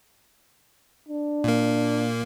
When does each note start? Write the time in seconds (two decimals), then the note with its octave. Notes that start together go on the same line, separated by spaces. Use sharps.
1.08 D4
1.44 A#2 A#3